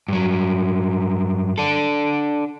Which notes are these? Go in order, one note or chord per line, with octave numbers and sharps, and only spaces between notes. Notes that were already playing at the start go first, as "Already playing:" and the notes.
G2 F#3
D4 A4